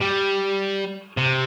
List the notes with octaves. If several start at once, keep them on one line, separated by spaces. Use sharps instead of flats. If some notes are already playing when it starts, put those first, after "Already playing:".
G3
C3